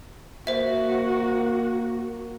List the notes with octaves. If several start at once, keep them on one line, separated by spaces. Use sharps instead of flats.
A#3 F#4 C5 E5